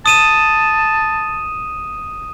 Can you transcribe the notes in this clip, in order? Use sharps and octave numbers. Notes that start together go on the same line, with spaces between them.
A5 D#6 D#7 E7